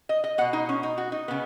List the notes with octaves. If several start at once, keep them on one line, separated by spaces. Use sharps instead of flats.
D#5
D#5
B2 B3 F#5
D#4
C#4
D#4
F#4
D#4
C#3 B3